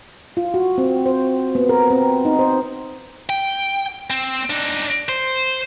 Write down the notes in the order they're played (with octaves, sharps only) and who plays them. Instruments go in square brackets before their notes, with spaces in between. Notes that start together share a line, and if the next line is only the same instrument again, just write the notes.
[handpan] F4
F#4
C4
C5
B3
A#4
C4
D#4
C5
[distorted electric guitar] G5
C4
D4 D#4
C5